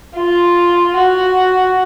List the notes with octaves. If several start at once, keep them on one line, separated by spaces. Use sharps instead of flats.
F4
F#4